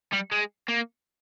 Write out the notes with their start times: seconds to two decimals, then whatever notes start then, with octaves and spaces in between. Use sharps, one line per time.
0.13 G3
0.32 G#3
0.69 A#3